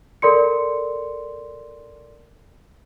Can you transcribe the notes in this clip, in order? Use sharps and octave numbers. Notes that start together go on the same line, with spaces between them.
A4 A#4 D5 C6 C#7